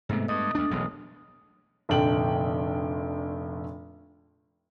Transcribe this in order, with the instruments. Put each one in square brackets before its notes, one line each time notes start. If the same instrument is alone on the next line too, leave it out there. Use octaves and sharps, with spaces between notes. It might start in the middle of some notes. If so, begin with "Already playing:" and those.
[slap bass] G#2 C3 [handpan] G#3 A3 B3
[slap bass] G2 [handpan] D#5 [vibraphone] D#6
[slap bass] D2 D4
E1 B1 E2
[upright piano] F1 A#1 D3 G5 F#7